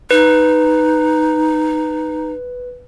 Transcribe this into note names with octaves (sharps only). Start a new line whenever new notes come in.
D#4 B4